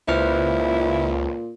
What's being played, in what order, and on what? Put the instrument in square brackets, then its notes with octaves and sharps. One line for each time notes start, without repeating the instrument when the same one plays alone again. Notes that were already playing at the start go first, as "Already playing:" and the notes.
[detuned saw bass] C#2 [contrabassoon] A#2 [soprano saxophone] E4 [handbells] B4 C5 F6